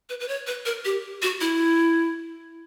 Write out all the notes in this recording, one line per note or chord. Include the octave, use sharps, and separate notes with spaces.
B4
B4
C#5
B4
A#4
G4
F#4
E4